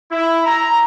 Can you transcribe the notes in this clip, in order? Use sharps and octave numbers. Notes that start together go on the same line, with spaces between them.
E4
A#5